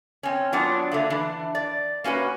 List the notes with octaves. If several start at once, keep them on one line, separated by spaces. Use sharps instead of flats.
C4 C#4
F#3 B3 D4 F4 F#5
D3 A3 A#3
E3 D4
D5
A#3 C#4 F#4 B4